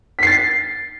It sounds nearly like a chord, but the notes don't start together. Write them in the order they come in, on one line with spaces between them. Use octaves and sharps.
B6 C7 A6